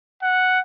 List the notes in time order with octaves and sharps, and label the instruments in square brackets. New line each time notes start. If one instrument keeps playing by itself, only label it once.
[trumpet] F#5